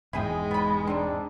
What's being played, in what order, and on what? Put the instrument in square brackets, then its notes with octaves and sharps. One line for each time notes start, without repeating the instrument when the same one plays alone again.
[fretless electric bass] E1 E2 G#2 [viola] G#3 [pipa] E4 G#4 G5
[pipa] B3 B5
[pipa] C4 D#4 [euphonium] D4